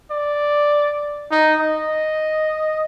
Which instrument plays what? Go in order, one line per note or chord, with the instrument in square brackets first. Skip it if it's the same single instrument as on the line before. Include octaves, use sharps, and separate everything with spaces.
[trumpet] D5
D#4
D#5